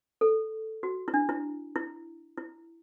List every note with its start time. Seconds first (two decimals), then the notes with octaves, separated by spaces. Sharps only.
0.21 A4
0.83 F#4
1.08 E4
1.14 D4
1.29 E4
1.76 E4
2.37 E4